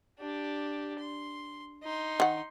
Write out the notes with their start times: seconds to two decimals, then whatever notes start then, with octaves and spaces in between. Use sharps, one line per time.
0.20 D4 G4
0.99 C6
1.83 D#4 C6
2.20 D#3 F#5